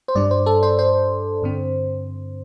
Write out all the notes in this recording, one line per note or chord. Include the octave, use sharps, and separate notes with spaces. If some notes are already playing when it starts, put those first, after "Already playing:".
C5
G2 G3 D4 D5
C5
A4
C5
C5
G2 D3 C4